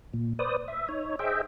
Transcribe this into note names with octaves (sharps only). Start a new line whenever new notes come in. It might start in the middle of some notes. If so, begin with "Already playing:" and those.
A#2
B4 C5 D5 D#6
E5
D#4 C#5
G#4 C5 D#5 E5 G5